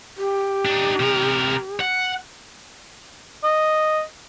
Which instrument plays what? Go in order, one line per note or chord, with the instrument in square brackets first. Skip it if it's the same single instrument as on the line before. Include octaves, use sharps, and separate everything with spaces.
[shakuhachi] G4
[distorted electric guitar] D4 D#4
C3 A#4
F#5
[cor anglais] D#5